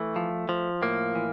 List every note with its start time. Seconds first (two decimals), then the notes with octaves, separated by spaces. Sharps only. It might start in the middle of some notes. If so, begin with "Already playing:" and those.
Already playing: E3 A3
0.16 F3
0.49 F3
0.82 A2 A#3
1.15 E3